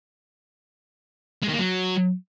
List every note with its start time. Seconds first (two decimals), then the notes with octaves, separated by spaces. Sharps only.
1.43 G#3
1.48 D#3
1.54 A#3
1.59 F#3